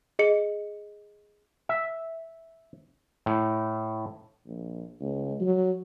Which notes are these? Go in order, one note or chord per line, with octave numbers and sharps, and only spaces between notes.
G#4 D#5 C#7
E5
A2
A#1
C#2
F#3